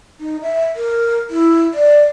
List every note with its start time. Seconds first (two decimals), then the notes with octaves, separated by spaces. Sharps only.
0.20 D#4
0.42 E5
0.76 A#4
1.30 E4
1.74 D5